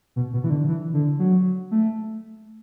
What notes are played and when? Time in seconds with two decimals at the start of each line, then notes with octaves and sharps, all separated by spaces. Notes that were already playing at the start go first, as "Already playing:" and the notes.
0.16 B2
0.33 B2
0.44 E3
0.50 D3
0.68 E3
0.94 D3
1.19 F#3
1.71 A3